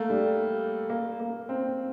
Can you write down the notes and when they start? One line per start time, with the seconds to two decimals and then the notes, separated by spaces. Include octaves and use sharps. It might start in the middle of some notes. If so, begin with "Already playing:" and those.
Already playing: A3 A#3
0.10 G3
0.90 A#3
1.20 A#3
1.49 C4